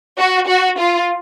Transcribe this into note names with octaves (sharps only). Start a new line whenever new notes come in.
F#4
F#4
F4